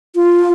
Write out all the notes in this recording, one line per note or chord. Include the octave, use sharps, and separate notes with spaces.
F4